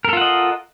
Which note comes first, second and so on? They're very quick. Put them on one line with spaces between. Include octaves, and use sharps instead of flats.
A#4 A4 F4 F#5 D#5